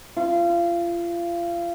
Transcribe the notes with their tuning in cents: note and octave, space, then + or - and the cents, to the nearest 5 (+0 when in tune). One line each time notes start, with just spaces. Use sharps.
F4 -30